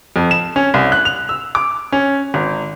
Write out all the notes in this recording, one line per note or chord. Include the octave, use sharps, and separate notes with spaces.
F2
E7
C#4
C2
F#6
F7
E6
D6
C#4
G#1